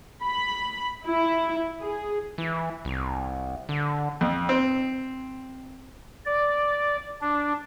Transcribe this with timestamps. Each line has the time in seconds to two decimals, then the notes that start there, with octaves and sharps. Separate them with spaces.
0.24 B5
1.06 E4
1.81 G#4
2.38 E3
2.85 C2
3.69 D3
4.21 F2
4.49 C4
6.26 D5
7.21 D4